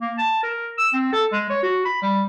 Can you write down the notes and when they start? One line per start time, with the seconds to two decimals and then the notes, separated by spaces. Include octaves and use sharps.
0.01 A#3
0.18 A5
0.43 A#4
0.78 E6
0.93 C4
1.13 A4
1.32 G#3
1.50 C#5
1.63 F#4
1.85 B5
2.02 G3